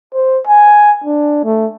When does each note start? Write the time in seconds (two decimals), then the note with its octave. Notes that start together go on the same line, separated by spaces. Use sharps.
0.14 C5
0.47 G#5
1.04 D4
1.44 A3